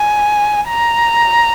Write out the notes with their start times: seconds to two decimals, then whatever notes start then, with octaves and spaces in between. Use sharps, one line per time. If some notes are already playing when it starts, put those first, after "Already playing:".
Already playing: G#5
0.69 A#5